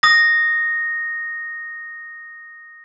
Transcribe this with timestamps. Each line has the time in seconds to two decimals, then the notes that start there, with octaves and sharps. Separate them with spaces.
0.03 D#6 A#6